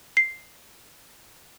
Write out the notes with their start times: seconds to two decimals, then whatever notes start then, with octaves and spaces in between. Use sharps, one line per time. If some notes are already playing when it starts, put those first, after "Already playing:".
0.17 C7